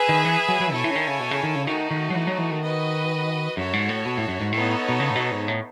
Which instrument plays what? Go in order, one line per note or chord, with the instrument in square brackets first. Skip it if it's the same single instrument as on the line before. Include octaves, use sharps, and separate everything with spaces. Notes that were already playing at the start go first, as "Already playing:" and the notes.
Already playing: [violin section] G#4 B4 E5 G#5
[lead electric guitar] D#3
E3
F#3
F#3
[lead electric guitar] B2 [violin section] E4 A4 C#5 G#5
[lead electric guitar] E3
C#3
D#3
C#3
B2
C#3
D#3
C#3
[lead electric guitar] D#3 [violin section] A3 D#4 F#4
[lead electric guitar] D#3
F#3
E3
F#3
E3
D#3
[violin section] F#4 B4 D#5
[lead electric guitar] F#2 [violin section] F#4 A4 C#5
[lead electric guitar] G#2
A2
B2
A2
F#2
G#2
[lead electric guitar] A2 [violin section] B3 D#4 A4 C#5
[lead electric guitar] B2
C#3
A2
B2
G#2
A2